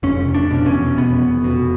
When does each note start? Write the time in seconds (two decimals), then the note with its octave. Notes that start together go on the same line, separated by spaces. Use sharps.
0.03 F1 C#4
0.27 F1
0.34 D4
0.51 B2
0.66 C#4
0.74 E2
0.97 F1 B3
1.22 F1
1.44 B2